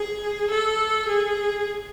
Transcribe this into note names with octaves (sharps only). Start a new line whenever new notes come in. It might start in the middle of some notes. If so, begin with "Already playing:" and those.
Already playing: G#4
A4
G#4